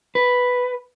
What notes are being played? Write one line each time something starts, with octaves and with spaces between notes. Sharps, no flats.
B4